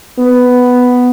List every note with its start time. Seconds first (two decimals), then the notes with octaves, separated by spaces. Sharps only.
0.19 B3